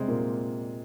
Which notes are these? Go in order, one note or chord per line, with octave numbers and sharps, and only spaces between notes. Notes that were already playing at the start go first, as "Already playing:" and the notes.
Already playing: C3 G3 G#3 C4
A#2 A#3